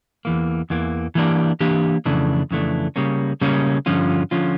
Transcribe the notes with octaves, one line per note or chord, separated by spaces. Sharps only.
E2 E3 A#3
E2 E3 A#3
E3 A#3 D4 G4
E3 A#3 D4 G4
F2 C#3 E3 A3 D4
F2 C#3 E3 A3 D4
C#3 G3 A#3 C#4
C#3 G3 A#3 C#4
G2 D3 F3 C#4 F4
D3 F3 C#4 F4